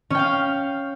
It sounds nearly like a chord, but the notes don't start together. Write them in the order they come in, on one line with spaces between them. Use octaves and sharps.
C#4 G5 F5